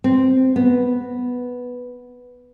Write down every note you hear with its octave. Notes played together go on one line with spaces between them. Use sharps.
C4
B3